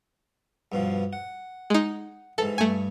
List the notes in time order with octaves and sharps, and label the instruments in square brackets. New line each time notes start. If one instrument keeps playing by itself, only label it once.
[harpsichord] G2 B2 F3
F#5
[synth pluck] G#3 D#4
[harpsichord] G#2 E3 [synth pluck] A4
[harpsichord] G2 C#6 [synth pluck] A3 G#5